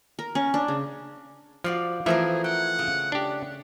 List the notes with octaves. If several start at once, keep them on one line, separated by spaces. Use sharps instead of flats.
A#4
C#4
D4
C#3
F3 F#4 D5 F5
E3 F3 A3 C4 G#4 A#4 E5
F#5 G5
C#3
D4 G4